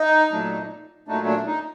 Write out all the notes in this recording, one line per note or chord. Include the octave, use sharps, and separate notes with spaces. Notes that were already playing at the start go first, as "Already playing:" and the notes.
Already playing: D#4
A#2 F#3 A3 D4
A#2 F#3 A3 D4 D#4
D4
D#4